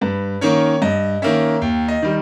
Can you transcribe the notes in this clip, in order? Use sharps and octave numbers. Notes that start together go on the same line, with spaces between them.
G2 B4
D#3 A#3 C#4 C#5
G2 D#5
D#3 A#3 C#4 E5
D#2 G5
D#5
D#3 G3